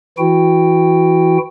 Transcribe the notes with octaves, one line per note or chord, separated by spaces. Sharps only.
E3 E4 F#4 G5